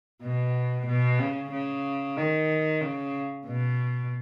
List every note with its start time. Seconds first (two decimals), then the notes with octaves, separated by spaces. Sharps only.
0.23 B2
0.87 B2
1.19 C#3
1.51 C#3
2.17 D#3
2.81 C#3
3.46 B2